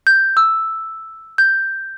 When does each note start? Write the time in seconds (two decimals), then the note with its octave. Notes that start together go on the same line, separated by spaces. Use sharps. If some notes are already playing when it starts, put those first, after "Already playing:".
0.07 G6
0.37 E6
1.38 G6